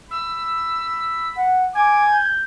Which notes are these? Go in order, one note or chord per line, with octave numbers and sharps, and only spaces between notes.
B5 E6
F#5
G#5 D6 G#6
G6